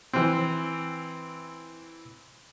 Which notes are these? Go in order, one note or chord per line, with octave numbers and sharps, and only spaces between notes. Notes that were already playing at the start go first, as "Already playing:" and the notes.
E3 C4